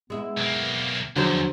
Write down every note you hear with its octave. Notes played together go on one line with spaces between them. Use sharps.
G#3 B3 E4
B1 A#3
E2 D3 F3 F#3 C5